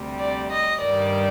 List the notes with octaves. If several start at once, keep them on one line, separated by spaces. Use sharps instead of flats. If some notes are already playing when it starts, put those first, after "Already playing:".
Already playing: D2 C3 G3
D5
D#5
G2 D#3 G3 D5